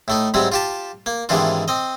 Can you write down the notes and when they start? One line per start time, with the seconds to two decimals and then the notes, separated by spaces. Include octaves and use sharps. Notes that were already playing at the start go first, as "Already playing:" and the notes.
0.08 A2 A3 D#4
0.34 G#2 C3 F#3 G3 C4
0.52 F4 G4 A5
1.06 A#3
1.29 G#2 C3 D#3 E3 D4 F4
1.68 C4 D#5